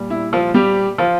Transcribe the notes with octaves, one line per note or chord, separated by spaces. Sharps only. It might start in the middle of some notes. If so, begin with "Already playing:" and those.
Already playing: A#2 G3
E4
F3 F4
G3 G4
F3 F4